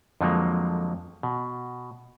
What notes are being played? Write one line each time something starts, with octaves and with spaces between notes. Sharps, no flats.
F2 D3 F3 F#3 G#3 A#3
B2